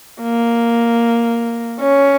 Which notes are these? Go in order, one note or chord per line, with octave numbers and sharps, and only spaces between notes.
A#3
C#4